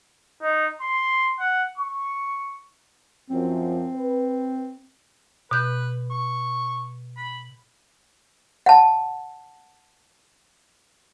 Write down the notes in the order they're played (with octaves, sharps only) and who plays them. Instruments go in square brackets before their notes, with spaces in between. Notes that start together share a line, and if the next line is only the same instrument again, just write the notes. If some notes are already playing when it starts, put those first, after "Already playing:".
[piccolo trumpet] D#4
C6
F#5
C#6
[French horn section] F#2 F3 [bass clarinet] C4
[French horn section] B4
[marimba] B2 G6 [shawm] B4
[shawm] C#6
B5
[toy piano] F#5 A5